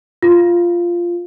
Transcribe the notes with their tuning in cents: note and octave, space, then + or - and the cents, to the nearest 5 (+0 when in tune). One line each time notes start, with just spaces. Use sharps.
F4 -5